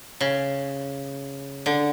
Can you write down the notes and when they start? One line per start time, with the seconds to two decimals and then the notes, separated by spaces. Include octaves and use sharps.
0.21 C#3
1.66 D3